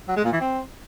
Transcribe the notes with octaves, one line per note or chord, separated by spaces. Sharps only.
F#3
G#3
A#2
E3
C4